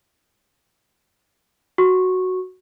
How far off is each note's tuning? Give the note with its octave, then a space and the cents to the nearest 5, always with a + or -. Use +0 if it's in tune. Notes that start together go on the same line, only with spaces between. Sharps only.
F#4 +0 C#6 -15